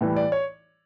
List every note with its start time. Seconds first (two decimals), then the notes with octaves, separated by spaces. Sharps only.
0.01 A2 E3 G3
0.16 D5
0.32 C#5